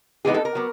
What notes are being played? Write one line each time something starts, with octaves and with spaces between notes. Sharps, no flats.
A2 E3 G#3 B3 D#4 G#4
A4
A#4
F#3 B3